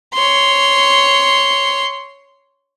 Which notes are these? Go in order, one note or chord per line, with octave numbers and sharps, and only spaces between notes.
C#5 C6